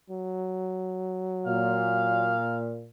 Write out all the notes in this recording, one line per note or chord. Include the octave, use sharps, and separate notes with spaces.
F#3
A#2 F5